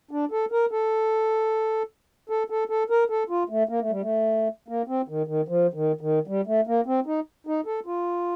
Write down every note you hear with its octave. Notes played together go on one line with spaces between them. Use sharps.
D4
A4
A#4
A4
A4
A4
A4
A#4
A4
F4
A3
A#3
A3
G3
A3
A#3
C4
D#3
D#3
F3
D#3
D#3
G3
A3
A#3
C4
D#4
D#4
A4
F4